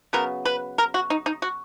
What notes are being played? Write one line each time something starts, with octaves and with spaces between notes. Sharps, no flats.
C#3 F#3 B3 A#4
B4
A#4
F#4
D#4
D#4
F#4